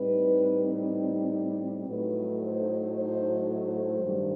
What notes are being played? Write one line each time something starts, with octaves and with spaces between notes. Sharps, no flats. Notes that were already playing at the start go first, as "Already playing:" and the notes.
Already playing: A2 G3 C4 D#4 B4
A2 F#3 A3 D#4 B4
C5
C5
C5
G2 D#3 G3